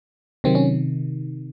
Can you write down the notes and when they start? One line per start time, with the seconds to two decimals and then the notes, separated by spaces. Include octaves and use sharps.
0.44 C3 D#3 F#3 C4
0.55 C#4